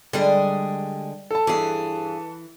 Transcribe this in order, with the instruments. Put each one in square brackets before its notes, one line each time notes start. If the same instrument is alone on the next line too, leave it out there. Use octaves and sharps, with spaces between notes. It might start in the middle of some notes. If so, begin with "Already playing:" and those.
[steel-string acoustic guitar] D3 G#3 G#4 [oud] G3
[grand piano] A4 A5
[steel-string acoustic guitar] G2 G#4 [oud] E3